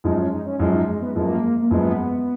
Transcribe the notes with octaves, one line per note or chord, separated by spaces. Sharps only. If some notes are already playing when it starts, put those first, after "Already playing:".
F#2 F3 G#3 D#4
C#4
D#4
C#4
F#2 F3 G#3 C#4
D#4
G#3
B3
F#2 F3 G#3 A#3
A#3
F#2 F3 G#3 B3